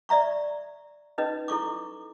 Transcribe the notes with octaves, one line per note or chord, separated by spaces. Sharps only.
D5 E5 A#5 C#6
C#4 D#4 B4 D#5
E4 A4 C#6 D6